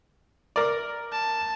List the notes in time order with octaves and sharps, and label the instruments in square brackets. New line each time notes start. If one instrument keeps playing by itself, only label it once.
[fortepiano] A#4 D5
[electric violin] A5